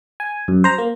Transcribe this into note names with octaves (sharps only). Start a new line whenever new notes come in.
G#5
F#2
C5 A#5
A#3